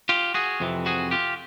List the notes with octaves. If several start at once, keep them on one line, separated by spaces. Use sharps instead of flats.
F4 G4
F#4 G#4
F2 C3 E3
F#4 G#4
F4 G4